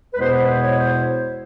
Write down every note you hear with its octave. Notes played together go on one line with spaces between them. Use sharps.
B4
E2 B2 G#3 B3 E4 C5
B4
C5
C#5
C5